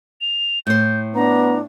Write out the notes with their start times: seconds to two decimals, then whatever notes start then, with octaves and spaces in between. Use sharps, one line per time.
0.21 F7
0.67 A2 C5 G6
1.15 B3 D4 A#5